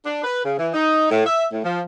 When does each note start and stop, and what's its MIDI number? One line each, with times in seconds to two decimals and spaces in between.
0.06 0.19 62
0.23 0.41 71
0.45 0.54 49
0.58 0.68 52
0.74 1.10 63
1.11 1.26 45
1.26 1.44 76
1.52 1.64 45
1.64 1.81 53